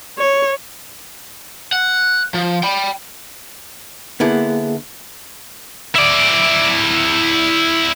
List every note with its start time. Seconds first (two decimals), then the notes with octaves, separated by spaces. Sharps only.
0.18 C#5
1.73 F#5
2.34 F3
2.63 G5 B5
4.20 D3 A#3 B3 E4 G#4
5.95 E4 D5